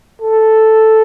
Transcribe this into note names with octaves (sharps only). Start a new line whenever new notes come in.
A4